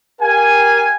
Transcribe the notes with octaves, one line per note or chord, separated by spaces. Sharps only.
G4 A#4 F5 G#5